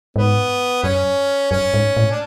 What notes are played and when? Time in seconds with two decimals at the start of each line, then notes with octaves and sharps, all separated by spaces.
0.16 G#2 B3
0.83 F#2 C#4
1.51 F#2 C#4
1.74 G#2
1.97 A2
2.11 D4